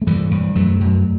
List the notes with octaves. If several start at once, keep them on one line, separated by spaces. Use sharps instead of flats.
A3
G2 E3 G3
G2
F#2 F#3 A3
F#2